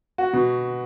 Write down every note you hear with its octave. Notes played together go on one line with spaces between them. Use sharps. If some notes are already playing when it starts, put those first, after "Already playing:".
F#4
B2